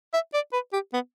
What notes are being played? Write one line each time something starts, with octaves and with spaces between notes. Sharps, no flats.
E5
D5
B4
G4
B3